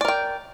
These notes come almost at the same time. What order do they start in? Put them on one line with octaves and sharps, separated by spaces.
D5 A#4 G5